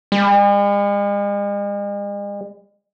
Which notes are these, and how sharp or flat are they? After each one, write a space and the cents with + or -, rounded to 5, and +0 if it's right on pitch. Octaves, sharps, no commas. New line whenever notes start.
G#3 -45